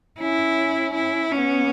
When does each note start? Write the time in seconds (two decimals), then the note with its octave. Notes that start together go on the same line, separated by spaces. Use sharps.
0.20 C#4 E4
0.94 E4
1.32 B3 C#4